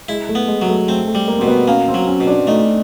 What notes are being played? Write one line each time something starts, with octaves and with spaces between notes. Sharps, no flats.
G#3 E4
A3
B3
G#3
F#3
A3
A3 C4
A3
G3
A#3
B2 C4
B3
A#3 C#4
C4
F#3
C#4
B2
D4
A3 D#4